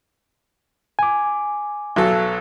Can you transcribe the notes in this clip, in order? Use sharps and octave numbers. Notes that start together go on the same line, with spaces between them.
G#5 D6
B1 F#3 A4